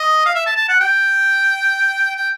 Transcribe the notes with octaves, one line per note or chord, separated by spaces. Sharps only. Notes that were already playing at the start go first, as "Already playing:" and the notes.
Already playing: D#5
F5
E5
A5
A5
F#5
G5
G5